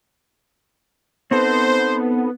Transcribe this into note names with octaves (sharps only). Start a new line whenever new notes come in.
B3 C4 D#4 A4 C5